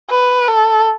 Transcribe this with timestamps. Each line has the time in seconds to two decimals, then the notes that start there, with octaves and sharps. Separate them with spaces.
0.10 B4
0.48 A4